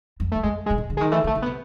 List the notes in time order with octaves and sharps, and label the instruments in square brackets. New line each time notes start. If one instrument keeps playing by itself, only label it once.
[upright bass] F2
[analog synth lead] A3
[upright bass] F#2
[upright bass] F2 [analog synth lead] G#3
[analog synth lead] G#3
[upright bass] A#2
A2
D3
[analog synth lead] G#3
[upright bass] D#3
[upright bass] E3 [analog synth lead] A3
[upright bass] D#3 [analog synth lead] A3
[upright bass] C#3
[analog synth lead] B3
[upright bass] C3